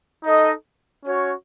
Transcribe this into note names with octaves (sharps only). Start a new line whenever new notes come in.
D#4 A4 D#5
C#4 F#4 C#5